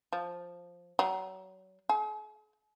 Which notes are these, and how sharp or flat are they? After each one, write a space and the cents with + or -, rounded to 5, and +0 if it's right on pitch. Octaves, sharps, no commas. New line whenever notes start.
F3 +5
F#3 +30
G#4 +45